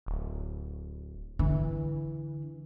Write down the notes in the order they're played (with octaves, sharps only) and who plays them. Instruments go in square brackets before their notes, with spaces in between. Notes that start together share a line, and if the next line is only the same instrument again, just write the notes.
[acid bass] D1
[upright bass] D3 [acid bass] E3